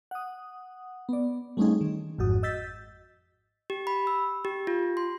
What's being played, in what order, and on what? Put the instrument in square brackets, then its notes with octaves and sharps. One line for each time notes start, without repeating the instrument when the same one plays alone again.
[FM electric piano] F#5 D#6
B3 D5
G3 A3 C4 C#4 D#4 G#4
D#3
G#1 F2 G#2 F#4 D#6
D#5 E6 G6 A6 B6
[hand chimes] G4
B5
E6
G4
F4
C6